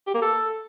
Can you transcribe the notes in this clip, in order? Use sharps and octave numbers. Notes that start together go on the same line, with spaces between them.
G4
A#3
A4